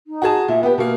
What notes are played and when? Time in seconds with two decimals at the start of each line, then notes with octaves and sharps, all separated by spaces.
0.07 D#4
0.22 F#4 G#4 A5
0.48 A#2 E5
0.63 B3 G4 B4
0.78 B2 A#3 A#4